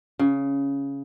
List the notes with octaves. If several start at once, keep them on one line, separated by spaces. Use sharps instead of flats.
C#3